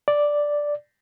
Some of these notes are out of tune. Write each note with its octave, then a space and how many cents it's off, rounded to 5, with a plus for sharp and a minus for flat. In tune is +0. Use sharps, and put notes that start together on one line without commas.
D5 +0